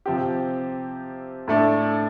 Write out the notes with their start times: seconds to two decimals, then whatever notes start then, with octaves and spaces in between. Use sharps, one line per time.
0.06 C3 F3 C4 G4
1.48 A2 A3 D4